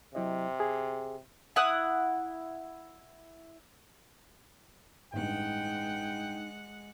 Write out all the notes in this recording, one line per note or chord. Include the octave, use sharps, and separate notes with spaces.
C3 F#3 E4 D#5
G#4
E4 F#5 D#6
A1 G2 G#3 D#4 F#5 G5